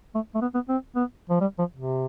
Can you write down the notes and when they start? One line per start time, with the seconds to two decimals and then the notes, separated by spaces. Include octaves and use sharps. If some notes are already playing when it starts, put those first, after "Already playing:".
0.15 A3
0.35 A3
0.41 B3
0.54 B3
0.69 C4
0.96 B3
1.30 F3
1.41 G3
1.59 F3
1.76 C3